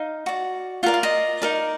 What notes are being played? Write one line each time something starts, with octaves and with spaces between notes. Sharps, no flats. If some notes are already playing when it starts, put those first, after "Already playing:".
Already playing: D#4 F5
F#4 D5
F4 A#4 D5 F#5
F5
D#5
D#4 A#4 D5